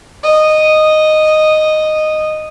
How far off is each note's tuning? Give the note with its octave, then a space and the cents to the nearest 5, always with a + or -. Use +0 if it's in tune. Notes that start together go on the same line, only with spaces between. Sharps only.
D#5 -10